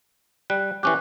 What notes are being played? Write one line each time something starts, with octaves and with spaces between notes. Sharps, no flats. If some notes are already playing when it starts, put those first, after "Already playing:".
G3 F#6
E3 C#4 G4 D6 F#6